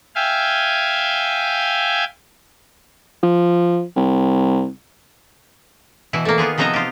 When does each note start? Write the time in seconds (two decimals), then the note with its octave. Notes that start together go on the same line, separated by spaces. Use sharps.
0.15 E5 F5 G5 G#5
3.23 F3
3.96 C2
6.13 B2 E3 E4
6.25 A3 A#3
6.38 D#3 B3 F4 G#4
6.58 C3 F3 B3 D#4 E5 A#5
6.74 F4 G4